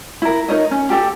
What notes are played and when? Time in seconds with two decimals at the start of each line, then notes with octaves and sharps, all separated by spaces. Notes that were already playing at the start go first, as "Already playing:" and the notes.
0.22 E4 A#4
0.48 D#4 A#4 C#5 D#5
0.71 C#4
0.90 G4 A4 G5